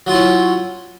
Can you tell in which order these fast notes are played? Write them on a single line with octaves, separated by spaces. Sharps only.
F#3 F4 E4 C#4